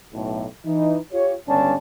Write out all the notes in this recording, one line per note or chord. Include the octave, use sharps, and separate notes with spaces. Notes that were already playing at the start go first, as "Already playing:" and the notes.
B1 A2
E3 D#4
F4 G4 C#5
G1 C#2 G2 C#4 D4 A5